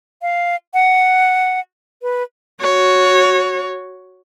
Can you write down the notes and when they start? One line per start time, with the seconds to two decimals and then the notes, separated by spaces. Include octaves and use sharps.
0.22 F5
0.74 F#5
2.02 B4
2.61 F#4 C#5